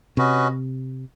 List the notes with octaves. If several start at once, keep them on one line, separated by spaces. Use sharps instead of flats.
C3 C#4 F#4 B4 D#5